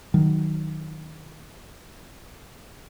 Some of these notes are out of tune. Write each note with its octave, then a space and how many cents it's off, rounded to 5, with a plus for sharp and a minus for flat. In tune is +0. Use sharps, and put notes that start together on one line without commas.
D#3 +0 F#3 +0